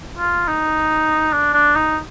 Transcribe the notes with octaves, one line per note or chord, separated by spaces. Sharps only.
F4
D#4
D4
D4
D#4